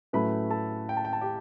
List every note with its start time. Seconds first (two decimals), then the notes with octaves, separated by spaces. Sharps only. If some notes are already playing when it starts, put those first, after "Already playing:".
0.13 A2 F#3 A3 C#4 E4 B4 B5
0.50 A4 A5
0.89 G5
0.97 A5
1.05 G5
1.13 A5
1.21 G4 G5